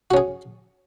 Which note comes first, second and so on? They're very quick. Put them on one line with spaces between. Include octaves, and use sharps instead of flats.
F#4 C#4 G#4